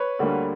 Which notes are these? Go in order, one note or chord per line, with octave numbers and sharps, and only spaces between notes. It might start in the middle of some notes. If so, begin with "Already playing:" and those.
Already playing: B4 C#5
D2 D3 G3 A#3